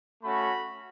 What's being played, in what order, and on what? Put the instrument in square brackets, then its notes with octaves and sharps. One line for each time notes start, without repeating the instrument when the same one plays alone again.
[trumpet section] A3 C#4 F#4 B5